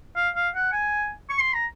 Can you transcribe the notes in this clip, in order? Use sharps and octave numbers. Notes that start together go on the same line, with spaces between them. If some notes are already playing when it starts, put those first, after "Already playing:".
F5
F5
F#5
G#5
C#6
C6
A#5